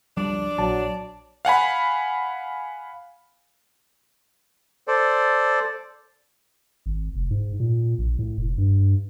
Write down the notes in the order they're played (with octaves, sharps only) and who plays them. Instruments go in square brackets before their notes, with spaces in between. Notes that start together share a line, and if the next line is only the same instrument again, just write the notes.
[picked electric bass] C#2 F3 G3 [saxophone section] D4 D5
[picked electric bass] A#1 [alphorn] F#3 [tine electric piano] A5
[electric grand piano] F5 F#5 G#5 B5
[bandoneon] A4 C5 D5
[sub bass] G#1
F1
G#2
A#2
A#1
A2
F1
G2